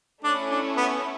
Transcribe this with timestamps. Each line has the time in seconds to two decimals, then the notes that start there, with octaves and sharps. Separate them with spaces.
0.23 A3 C#4 D4 E4
0.51 D4
0.77 B3